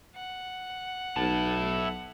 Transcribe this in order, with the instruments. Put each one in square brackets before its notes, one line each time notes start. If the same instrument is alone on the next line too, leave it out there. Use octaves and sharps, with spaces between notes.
[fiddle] F#5
[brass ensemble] B1 [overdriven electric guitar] E4 A5